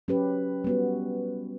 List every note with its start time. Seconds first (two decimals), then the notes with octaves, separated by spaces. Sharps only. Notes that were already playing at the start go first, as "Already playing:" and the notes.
0.08 F#3 C#4 G4 B4
0.64 G3 B3 F#4